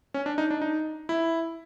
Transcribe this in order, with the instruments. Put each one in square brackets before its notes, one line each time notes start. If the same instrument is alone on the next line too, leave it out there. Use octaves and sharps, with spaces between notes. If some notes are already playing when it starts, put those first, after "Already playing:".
[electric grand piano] C#4
D4
D#4
D4
D#4
E4